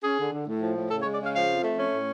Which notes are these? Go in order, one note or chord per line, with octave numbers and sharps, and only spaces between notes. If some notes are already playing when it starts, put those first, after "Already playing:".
C#4 G#4
D3
D3
A2
F3
A2
C#3 A4
C#5
G#3
D5
C#3 F5
F3 F5
F2
A3
C#4
A2